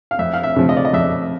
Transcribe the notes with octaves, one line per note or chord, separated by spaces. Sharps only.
F5
F2 E5
F5
E5
C#3 F3
D#5
D5
D#5
F2 E5